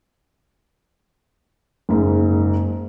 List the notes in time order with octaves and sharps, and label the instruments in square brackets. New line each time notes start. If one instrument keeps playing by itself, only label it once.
[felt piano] F#1 G#2